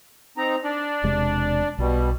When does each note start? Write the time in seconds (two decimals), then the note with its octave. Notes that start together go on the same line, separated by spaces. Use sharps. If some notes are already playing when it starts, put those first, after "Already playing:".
0.37 C4 D#4 A#5
0.64 D4 D5
1.04 E1 C3 G#3
1.78 B1 B2 G3